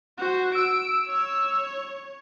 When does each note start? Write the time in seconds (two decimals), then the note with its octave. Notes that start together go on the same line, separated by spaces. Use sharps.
0.18 F#4 C5
0.55 E6 D7
1.07 C#5